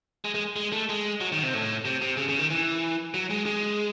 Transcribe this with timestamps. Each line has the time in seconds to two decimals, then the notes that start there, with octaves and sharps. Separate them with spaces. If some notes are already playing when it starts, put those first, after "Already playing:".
0.25 G#3
0.35 G#3
0.56 G#3
0.73 A3
0.89 G#3
1.21 F#3
1.32 D#3
1.43 C3
1.54 A2
1.85 C3
2.02 C3
2.17 C#3
2.29 C#3
2.39 D#3
2.50 E3
3.14 F#3
3.30 G#3
3.46 G#3